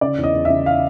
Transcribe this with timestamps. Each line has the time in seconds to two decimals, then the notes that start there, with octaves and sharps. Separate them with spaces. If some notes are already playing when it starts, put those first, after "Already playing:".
0.01 C#3 D5
0.18 E2
0.24 D#5
0.34 E2
0.45 C#3 E5
0.66 F5